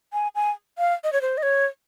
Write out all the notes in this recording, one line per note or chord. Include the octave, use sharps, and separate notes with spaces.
G#5
G#5
F5
D#5
C#5
C5
D#5
C#5